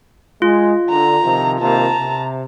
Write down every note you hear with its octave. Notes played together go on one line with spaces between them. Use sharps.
G#3 F4
D3 A#5
C3 D#3 F3
C3 D#3 A#3 A5 A#5
C3